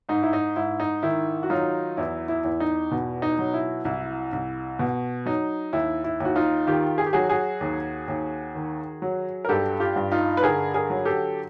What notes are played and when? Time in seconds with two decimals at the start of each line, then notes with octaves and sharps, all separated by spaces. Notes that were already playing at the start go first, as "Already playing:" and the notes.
0.09 G#2 D#4
0.23 E4
0.33 D#4
0.56 G#2 E4
0.80 D#4
1.03 D#3 E4
1.43 F#4
1.50 F#3 D#4 F4
1.97 E2 E4
2.28 E4
2.44 E2
2.60 D#4
2.91 B2
3.22 D#4
3.39 F#3
3.54 E4
3.85 C2 E4
4.33 C2
4.79 B2
5.26 F#3 D#4
5.73 D#2 E4
6.04 E4
6.20 D#2
6.25 F#4
6.36 D#4 F4
6.67 D#3 F4 G4
6.98 G#4
7.06 G4
7.13 F#3 F#4 G#4
7.29 F#4 G#4
7.61 D#2
8.08 D#2
8.55 D#3
9.02 F#3
9.45 A#4
9.49 G2 G4 A4
9.80 F4 G4
9.96 G2
10.12 D#4 F4
10.37 B4
10.43 D3 G#4 A#4
10.74 G#4 A#4
10.90 F#3
11.05 G4 A4